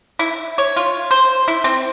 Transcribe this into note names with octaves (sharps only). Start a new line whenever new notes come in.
E4
C#5
F4
C5
E4
C4